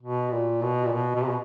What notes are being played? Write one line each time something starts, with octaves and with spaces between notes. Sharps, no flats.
B2
A#2
B2
A#2
B2
B2
C3
B2